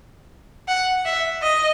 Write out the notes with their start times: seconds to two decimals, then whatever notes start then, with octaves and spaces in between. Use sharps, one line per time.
0.68 F#5
1.05 E5
1.43 D#5